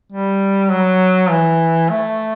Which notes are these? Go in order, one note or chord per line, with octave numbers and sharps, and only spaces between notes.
G3
F#3
E3
A3